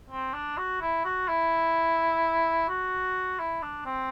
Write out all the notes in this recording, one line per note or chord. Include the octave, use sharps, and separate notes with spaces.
C4
D4
F#4
E4
F#4
E4
F#4
E4
D4
C4